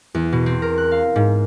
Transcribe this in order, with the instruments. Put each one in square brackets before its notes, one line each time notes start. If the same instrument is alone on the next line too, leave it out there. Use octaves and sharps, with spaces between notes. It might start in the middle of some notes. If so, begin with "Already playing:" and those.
[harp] E2
B2
C4
A#4
F#6
F5
G#2